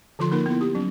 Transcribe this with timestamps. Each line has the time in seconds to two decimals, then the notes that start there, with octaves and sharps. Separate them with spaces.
0.19 D3 F3 F4 C6
0.31 A#3 D#4 A#4
0.46 B3 E4
0.61 G4
0.75 F#3 C#4